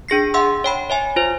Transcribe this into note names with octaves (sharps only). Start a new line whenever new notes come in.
D4 G#4 A#6 C7
E5 F#5 C6 E6
C#5 G5 B5
C#5 E5 G#5
F4 C5